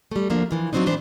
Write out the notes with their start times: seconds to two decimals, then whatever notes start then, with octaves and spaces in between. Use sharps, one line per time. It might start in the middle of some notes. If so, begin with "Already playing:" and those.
0.11 G3 A3
0.30 D2 F3 A#3 D4
0.51 A#2 E3 F3
0.73 F3 F#3 G#3 C4 D4 D#4
0.86 A2 E3 D4 C5